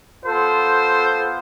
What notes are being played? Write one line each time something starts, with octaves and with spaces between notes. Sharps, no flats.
B3 F4 A4 C5